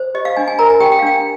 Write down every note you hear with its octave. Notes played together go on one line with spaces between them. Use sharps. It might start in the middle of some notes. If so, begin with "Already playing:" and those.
Already playing: C5
G4 D#5
F5
D4 G#5
G#5
A#4 A#5
G#5
G4 G5
G5
F5
D4 G5